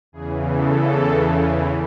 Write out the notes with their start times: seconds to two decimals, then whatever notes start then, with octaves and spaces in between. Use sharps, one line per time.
0.12 E2 C#3 E3 G#4
0.52 A4